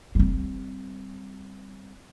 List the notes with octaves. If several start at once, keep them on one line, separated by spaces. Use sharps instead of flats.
G3 C4